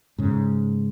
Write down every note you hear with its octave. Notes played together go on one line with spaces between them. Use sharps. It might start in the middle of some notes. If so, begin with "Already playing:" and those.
G#2 C#3